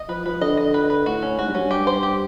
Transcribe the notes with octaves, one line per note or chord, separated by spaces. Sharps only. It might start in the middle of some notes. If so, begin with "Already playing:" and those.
Already playing: D#5
F3 B4
F3 B4
D3 D#5
D#5
B4
B4
A2 F#4
C#4
G#2 F#4
G2
F#2 C#4
G2
G4
C5
G4